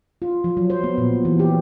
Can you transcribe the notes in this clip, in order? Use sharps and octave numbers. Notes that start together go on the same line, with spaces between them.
F4
F3
F#3
C5
B3
A#2
E3
G4